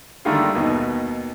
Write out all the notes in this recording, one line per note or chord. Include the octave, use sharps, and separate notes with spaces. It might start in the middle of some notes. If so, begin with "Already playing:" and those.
D3 D#3 G3 A3 A#3 F4
D#2 B2 D#4